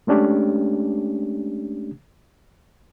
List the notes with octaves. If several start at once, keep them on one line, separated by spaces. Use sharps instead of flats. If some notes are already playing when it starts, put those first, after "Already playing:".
G#3 A3 C#4 D4 G4